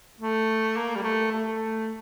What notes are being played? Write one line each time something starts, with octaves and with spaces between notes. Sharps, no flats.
A3
A#3
G3
A3
A3